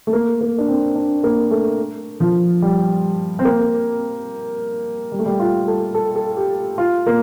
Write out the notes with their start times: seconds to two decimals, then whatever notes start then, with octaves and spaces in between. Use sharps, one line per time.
0.07 A3
0.13 A#3
0.41 A#3
0.58 D4
0.68 C4
0.96 D4
1.23 A#3
1.51 A3
2.20 F3
2.62 G3
3.39 C4
3.45 A#3
5.12 G3
5.19 A3
5.26 G3
5.40 F4
5.68 A4
5.95 A4
6.16 A4
6.37 G4
6.78 F4
7.06 A#3